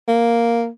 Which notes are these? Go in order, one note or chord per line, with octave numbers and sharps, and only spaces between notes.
A#3